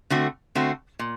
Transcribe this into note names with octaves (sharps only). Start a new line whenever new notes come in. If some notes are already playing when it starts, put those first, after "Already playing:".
D3 A3 C4 F#4
D3 A3 C4 F#4
A#2